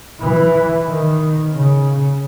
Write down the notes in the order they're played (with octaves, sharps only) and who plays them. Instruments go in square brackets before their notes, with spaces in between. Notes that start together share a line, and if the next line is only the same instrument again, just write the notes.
[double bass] E3
D#3
C#3